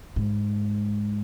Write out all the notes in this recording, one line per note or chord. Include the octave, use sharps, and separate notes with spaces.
G#2